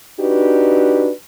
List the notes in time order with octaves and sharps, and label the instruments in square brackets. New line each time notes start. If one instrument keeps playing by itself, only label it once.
[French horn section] D4 D#4 F#4 G4 B4